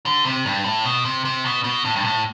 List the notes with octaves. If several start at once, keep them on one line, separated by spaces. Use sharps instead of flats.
D3
C3
G2
A2
B2
C3
C3
B2
B2
A2
G2
A2